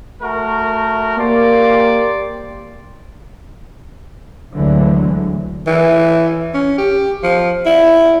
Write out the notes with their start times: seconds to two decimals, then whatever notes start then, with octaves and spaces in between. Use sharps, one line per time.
0.21 A3 F#4 A#4
1.18 A#3 G4 C5 D5
4.55 D2 D3 E3 F#3 G#3
5.67 E3
6.54 C#4
6.78 G4
7.23 F3
7.66 E4